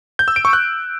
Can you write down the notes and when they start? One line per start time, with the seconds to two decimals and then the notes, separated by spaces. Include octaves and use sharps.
0.19 G6
0.28 E6
0.36 D7
0.45 C#6
0.53 F#6